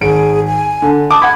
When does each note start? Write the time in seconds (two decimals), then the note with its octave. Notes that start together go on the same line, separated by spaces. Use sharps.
0.01 G#1 G#4 D7
0.47 G#5
0.82 D3
1.11 A5 D6 D#6
1.22 F#5 B5 G#6